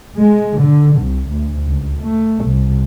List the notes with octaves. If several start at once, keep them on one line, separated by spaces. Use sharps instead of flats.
G#3
D3
C2
D2
C#2
A3
C2